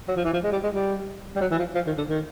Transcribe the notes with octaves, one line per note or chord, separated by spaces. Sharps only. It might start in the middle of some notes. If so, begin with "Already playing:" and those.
F#3
F3
E3
F3
G#3
G3
G#3
G3
G3
F#3
E3
F3
F3
D#3
D3
D#3